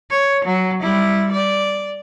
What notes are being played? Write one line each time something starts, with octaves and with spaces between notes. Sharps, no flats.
C#5
F#3
G3 E4
D5